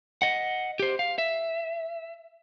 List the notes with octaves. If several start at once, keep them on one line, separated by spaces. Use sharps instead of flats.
D#5 F#5
G4 C5
F5
E5